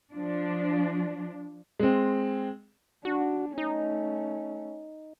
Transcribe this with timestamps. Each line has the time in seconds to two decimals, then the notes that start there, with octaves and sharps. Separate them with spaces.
0.15 F3 D4
1.79 G#3 C4
3.05 D4 F#4
3.58 A3 C#4 D#4